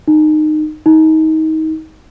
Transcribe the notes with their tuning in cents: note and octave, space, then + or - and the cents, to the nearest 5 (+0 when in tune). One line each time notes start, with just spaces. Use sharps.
D#4 -20
D#4 +25